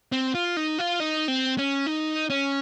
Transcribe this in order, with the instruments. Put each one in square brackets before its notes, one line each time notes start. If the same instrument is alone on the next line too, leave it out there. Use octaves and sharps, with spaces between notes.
[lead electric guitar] C4
F4
D#4
F4
D#4
C4
C#4
D#4
C#4